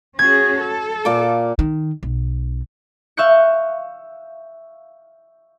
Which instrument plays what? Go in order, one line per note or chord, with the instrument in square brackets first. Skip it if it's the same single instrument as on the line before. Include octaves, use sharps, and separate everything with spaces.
[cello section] C#4 F#4 G#4 [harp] G#6
[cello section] A4
[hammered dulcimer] A#2 F5 D6
[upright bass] D#3
B1
[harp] E5 F5 C#6 F#6 G6 C#7